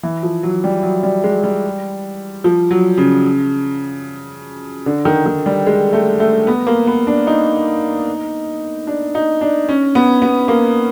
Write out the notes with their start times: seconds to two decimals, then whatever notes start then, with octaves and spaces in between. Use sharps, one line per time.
0.03 E3
0.23 F3
0.43 F#3
0.64 G3
0.83 F#3
1.03 G3
1.24 G#3
1.43 G3
2.44 F3
2.71 F#3
2.98 C#3
4.86 D3
5.05 D#3
5.26 D#3
5.46 G3
5.67 G#3
5.93 A3
6.20 A3
6.47 B3
6.67 A#3
6.87 B3
7.07 D4
7.27 D#4
8.87 D4
9.15 D#4
9.41 D4
9.69 C#4
9.95 B3
10.22 B3
10.48 A#3